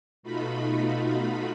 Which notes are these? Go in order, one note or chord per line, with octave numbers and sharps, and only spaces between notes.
B2 A3 D#4 F4 F#4 B5